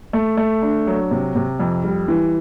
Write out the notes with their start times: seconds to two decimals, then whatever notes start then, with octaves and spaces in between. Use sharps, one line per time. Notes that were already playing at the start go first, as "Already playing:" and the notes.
0.13 A3
0.37 A3
0.62 D4
0.87 F#3
1.11 C3
1.35 C3
1.60 F2
1.84 G3
2.08 E3